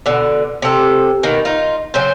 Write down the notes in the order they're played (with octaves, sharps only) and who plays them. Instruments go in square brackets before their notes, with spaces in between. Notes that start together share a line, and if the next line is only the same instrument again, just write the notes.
[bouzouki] B2 D3
C3 A4
B2 D#3 A#3
D#4 F4
C#3 F#3 C5